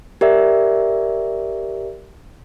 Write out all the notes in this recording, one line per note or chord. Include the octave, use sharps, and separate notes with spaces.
G4 A#4 D5 E5